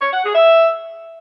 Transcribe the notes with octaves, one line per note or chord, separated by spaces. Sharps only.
C#5
F#5
G#4
E5